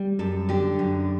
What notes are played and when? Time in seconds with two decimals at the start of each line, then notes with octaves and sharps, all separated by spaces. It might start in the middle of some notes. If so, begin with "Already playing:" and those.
Already playing: G3
0.19 F#2 A4
0.49 D3 G4
0.79 F#2